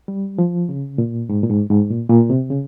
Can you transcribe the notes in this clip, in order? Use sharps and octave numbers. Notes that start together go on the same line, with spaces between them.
G3
F3
C#3
A#2
G#2
A#2
G#2
G#2
A#2
A#2
C3
C#3